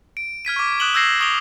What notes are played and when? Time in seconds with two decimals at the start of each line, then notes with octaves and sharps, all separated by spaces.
0.17 D7
0.45 F6 G#6 B6 D#7
0.56 C#6 D6
0.80 D#6 F#6 D7 E7 F#7 G7
0.94 E6 G6 G#6 A#6 C7 E7
1.20 C#6 D#6 D7 F7 G7